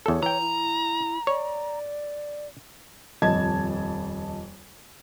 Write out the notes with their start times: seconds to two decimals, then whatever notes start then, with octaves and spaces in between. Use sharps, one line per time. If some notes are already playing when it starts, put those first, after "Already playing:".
0.06 E2 A4 C#5
0.23 E3 G5 A#5
0.41 E4
1.27 C#5 D5
3.22 D#1 F2 D#5 A5 G#6